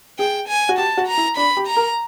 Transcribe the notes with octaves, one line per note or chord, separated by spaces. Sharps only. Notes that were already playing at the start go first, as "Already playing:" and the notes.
G#4 G5
G#5
F#4
G4 A5
F#4
A#5
E4
D4 B5
G4
A#5
A#4